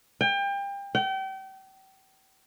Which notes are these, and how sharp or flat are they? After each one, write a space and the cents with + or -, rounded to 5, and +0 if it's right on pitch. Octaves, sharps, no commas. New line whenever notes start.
G5 +30
G5 -35